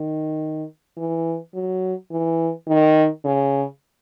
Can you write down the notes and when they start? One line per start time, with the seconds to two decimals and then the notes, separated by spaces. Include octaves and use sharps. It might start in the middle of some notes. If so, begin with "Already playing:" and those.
Already playing: D#3
0.97 E3
1.54 F#3
2.11 E3
2.68 D#3
3.24 C#3